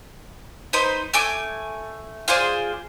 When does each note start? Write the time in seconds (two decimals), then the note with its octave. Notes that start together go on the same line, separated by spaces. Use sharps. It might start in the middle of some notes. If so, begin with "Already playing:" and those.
0.73 D#4 B4 C5
1.14 A3 G#5 D6
2.28 F4 G#4 C5 D5